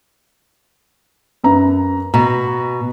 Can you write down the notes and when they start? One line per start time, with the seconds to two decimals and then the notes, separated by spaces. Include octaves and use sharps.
1.44 F#2 B4 A#5
2.14 B2 A#5